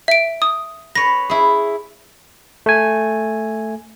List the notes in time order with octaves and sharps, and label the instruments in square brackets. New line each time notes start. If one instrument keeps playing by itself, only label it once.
[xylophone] E5 D7
D#6
[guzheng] B4 C#5 [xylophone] A#6
[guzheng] E4 G#4
[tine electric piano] A3 G#5